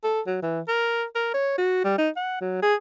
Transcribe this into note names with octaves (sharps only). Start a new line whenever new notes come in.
A4
F#3
E3
A#4
A#4
C#5
F#4
G3
D#4
F#5
F#3
G#4